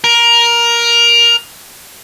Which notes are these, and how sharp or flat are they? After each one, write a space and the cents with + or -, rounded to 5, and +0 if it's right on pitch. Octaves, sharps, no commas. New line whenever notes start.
A#4 +15